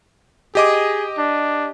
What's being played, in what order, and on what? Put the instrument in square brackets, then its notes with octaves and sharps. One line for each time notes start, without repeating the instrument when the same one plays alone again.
[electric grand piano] G4 D#5 D6 [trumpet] G#4
[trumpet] D4